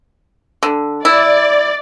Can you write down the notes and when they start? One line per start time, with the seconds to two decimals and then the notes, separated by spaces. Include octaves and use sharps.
0.63 D3
1.05 E4 D5